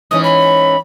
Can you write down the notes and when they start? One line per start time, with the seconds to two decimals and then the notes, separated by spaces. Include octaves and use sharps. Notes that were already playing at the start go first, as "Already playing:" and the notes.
0.11 G#2 E3 C#4 D#6
0.24 B5